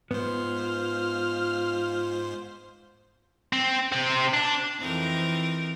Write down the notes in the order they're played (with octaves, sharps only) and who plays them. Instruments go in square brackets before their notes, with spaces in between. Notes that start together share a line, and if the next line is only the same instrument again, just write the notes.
[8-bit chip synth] G#2 C5 [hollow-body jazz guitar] B3 [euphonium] F4 [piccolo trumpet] F6
[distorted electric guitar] C4
C3 C4
D4
[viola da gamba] F2 E3 C4 [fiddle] D#4 A#4